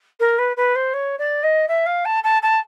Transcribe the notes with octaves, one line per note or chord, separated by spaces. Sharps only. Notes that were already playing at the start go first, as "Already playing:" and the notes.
A#4
B4
B4
C5
C#5
D5
D#5
E5
F5
A5
A5
A5